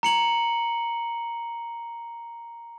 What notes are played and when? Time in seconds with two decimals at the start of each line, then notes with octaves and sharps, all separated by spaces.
0.03 A#5 C#7 F#7